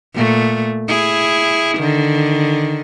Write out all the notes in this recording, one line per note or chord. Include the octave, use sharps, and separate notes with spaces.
A#2 A3
E4 G#4
D3 D#3